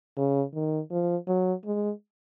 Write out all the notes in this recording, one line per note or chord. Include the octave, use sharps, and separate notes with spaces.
C#3
D#3
F3
F#3
G#3